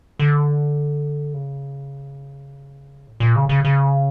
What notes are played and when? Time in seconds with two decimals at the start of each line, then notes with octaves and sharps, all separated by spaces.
0.19 D3
1.34 C#3
3.07 A2
3.20 A#2
3.36 C#3
3.49 C#3
3.65 C#3